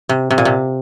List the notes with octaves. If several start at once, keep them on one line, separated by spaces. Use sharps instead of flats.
C3
C3
A#2
C3